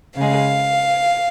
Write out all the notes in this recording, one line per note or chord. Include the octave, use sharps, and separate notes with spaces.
C#3 G#3 F5